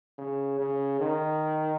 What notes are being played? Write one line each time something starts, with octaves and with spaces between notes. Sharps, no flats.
C#3
C#3
D#3